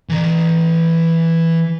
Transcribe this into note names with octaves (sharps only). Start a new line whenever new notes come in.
E3 A#5